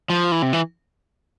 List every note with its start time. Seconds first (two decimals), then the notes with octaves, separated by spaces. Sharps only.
0.10 F3
0.32 E3
0.42 C3
0.53 E3